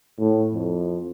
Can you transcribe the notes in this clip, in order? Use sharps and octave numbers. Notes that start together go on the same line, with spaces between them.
A2
F2